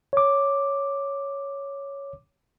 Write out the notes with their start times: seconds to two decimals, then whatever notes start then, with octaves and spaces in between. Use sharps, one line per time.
0.13 C#5 D6